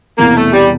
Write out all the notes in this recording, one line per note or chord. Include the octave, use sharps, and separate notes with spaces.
E1 E2 C3 E3 A#3
A3
G3